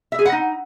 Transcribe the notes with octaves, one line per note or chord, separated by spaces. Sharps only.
E5
G#4
F#5
D#4